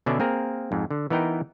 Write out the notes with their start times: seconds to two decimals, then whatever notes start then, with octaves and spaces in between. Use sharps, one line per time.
0.06 B2 D3 C#4 D4 D5 E5
0.20 A#3 C4 G#4 A#4
0.72 F2 G#2
0.91 D3
1.10 E3 B3 D#4 A#4 G5